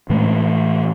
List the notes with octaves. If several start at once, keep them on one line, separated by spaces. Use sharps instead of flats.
A2 E3 G#3 A3